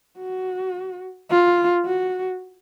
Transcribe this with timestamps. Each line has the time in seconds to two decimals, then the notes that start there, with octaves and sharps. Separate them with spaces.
0.20 F#4
1.30 F4
1.85 F#4